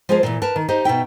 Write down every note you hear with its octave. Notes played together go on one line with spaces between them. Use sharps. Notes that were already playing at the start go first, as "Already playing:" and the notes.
F3 G#3 F4 G#4 A#4 C5
A#2 E3
A#4 B4 A5
D#3
D#4 G4 C5 D#5
B2 D#4 E5 G5